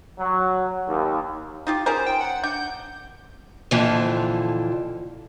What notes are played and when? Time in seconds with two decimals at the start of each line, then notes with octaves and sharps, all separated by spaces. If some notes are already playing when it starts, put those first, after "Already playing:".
0.19 F#3
0.87 D#2
1.67 D#4 F4 G4
1.86 C#4 G#4 A#4 C5
2.06 G5
2.20 F#5
2.44 D4 G6
3.71 F2 A#2 D3 E3 F3